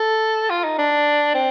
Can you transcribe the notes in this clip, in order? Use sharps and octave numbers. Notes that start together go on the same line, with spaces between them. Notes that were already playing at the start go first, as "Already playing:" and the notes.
Already playing: A4
F4
D#4
D4
C4